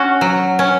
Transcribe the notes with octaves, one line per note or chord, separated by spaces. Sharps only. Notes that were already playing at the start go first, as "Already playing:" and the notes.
Already playing: C#4 F#4
F#3
C#4